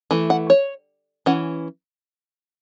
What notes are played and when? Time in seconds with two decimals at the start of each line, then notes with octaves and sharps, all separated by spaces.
0.11 E3 A3
0.30 F#5
0.50 C#5
1.26 E3 C#4 F#5